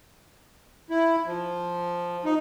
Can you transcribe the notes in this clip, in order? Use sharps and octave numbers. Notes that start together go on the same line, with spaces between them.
E4
F3
D#4